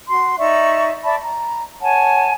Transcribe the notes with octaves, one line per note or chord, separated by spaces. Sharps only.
F#4 C6
D#4 D5 E5 C#6
D5 E5 A5 B5
A#5
C#5 F#5 G#5 A5